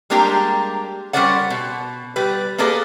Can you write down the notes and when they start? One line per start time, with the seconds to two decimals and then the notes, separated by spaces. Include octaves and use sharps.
0.10 G3 G#3 A#3 D4 G4 A#5
1.13 G3 C#4 A#4 C5 D5 F#5
1.50 B2
2.16 G3 B4
2.58 A#3 B3 G#4 A4 B4 D5